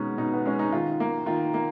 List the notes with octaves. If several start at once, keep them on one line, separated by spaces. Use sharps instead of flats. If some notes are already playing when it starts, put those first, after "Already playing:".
Already playing: B2 G#3 B3 C#4 D#4
B2 D#4
B3
G#3 C#4
D#4
D#3 F4
A#3
D#3 F4
A#3